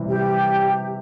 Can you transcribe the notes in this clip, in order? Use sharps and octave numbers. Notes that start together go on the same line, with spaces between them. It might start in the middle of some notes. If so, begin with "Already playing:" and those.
Already playing: C3 E3 G3 C4
G4